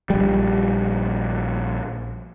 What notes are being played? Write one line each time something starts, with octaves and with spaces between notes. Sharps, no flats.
A#1 G3